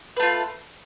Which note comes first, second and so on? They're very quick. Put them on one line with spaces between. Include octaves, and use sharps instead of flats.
B4 A3 F4